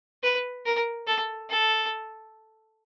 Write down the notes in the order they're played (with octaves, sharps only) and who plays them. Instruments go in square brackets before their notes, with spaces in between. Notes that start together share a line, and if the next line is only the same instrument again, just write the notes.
[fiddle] B4
A#4
A4
A4